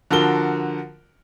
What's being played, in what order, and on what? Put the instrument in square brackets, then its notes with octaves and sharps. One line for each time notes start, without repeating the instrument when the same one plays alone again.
[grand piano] D3 F3 F#4 A#4 G7